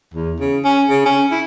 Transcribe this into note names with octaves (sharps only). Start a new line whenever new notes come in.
E2
C#3
C#4
C#3
C#4
E4